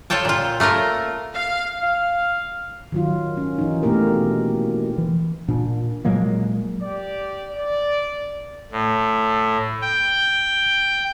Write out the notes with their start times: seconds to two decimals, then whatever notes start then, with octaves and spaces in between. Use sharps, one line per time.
0.10 F4 A4 C#5 G5 A5
0.25 A#2 F4
0.60 A3 A#3 F4 A#4
1.34 F5
1.82 F5
2.92 D#3 F#3 F4
3.37 C#4
3.58 E3 D#4
3.83 B2 A3 A#3 G4 A#4
4.98 E3
5.48 A#2 D4
6.05 A#2 F#3 G#3 A#3
6.83 G4 D5
7.55 D5
8.72 A2
9.82 G5